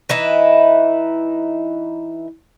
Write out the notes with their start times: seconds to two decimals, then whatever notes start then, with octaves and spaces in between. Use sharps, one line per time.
0.09 E3 D#4 E4